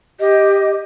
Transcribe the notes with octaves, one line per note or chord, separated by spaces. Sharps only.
G4 D#5